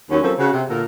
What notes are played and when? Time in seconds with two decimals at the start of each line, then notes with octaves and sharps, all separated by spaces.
0.10 D#2 F#3 C#4
0.23 F3 F#3 A#3 C4 C#4 A4
0.38 C#3 F#4
0.53 C3
0.69 A#2 D3 A4 A#4